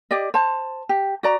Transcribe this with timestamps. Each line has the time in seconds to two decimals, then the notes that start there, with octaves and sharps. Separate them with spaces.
0.11 G4 D5 D#5
0.34 C5 A5
0.89 G4
1.23 F#4 D5 A#5